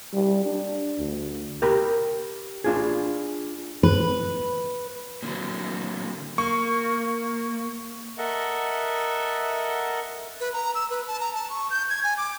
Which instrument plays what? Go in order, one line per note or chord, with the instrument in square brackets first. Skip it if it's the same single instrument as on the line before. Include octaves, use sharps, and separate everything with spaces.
[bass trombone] G3
D4
D2
[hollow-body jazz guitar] G4 A#4 B5
D4 F4 G#4
[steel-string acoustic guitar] B4
[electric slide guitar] A#2 D3 F#3
[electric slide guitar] A#3 [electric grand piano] C#6
[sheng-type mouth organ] A4 A#4 D#5 E5 F#5
[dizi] B4
A#5
E6
B4
A5
A#5
A5
C#6
G6
G#6
G#5
D6